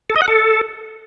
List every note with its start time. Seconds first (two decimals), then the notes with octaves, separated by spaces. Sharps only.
0.10 A4
0.16 D#5
0.22 F#5
0.28 A4